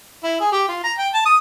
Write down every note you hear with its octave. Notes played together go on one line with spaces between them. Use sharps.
E4
G#4
G4
F4
A#5
G5
A5
D#6